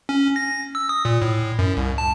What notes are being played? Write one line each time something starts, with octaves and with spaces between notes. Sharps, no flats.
C#4
A#6
E6
D#6
A#2
A2
F#2
C2
A5